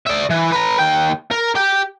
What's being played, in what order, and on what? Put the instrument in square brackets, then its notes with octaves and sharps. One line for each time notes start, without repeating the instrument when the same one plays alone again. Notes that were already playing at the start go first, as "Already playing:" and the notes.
[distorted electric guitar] D5 E5
E3
B4 A#5
D#2 G5
A#4
G4 G5